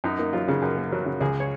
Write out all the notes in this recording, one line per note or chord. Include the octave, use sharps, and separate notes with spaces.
F#2 D#4
A#3 D#4
F#3 F4
C#3 G#4
F#2 A#4
A#3
F#3
C#3
C#2 G#4
C#5